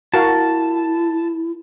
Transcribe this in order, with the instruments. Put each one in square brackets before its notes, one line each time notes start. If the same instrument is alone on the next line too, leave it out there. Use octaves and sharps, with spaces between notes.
[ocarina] E4 [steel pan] F#4 A#4 F5 [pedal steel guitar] A5